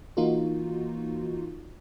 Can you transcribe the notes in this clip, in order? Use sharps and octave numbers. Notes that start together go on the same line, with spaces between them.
E3 A#3 D#4 F4 F#4